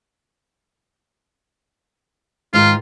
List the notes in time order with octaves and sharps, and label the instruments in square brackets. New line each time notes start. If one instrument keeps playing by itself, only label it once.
[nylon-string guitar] G#2 D#3 [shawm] F4